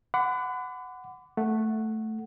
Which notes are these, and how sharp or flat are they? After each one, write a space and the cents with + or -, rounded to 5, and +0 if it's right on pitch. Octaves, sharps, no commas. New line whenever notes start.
F#5 +0 B5 +40 D6 -10
A3 +0 F#5 +0